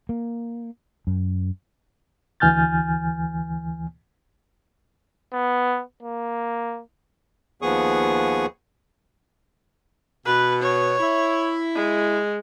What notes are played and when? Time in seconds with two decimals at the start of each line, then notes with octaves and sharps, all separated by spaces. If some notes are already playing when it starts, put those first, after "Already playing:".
0.09 A#3
1.07 F#2
2.40 D2 E3 G#5 F6 G6 A6
5.33 B3
6.03 A#3
7.62 D#2 F3 B3 G#4 C#6 D#6
10.26 B2 B4
10.62 C#5
11.00 E4
11.75 G#3